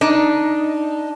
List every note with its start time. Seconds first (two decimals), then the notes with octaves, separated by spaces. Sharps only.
0.01 D4 D#4